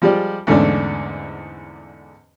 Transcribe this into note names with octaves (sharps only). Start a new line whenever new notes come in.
F3 G3 G#3 G4 D5
E2 G#2 D3 A3 C#4 D4